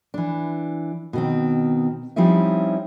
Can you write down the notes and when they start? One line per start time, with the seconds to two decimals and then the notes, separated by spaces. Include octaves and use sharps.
0.14 E3 D4
1.13 B2 D#3 C4
2.16 F3 G3 C4 C#4 D#4 E4